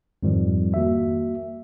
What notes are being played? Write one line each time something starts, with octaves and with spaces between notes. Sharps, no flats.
F2 G#2 D#3 F3 G3
A#3 F#4 E5